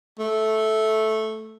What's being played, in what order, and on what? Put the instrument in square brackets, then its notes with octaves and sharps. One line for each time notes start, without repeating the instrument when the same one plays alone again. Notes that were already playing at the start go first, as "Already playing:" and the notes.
[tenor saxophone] A3